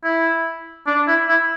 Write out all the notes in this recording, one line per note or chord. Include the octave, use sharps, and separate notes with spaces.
E4
D4
E4
E4